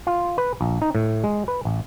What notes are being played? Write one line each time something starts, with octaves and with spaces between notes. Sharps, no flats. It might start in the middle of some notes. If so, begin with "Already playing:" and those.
F4
B4
A#1
D#4
A2
G#3
B4
A1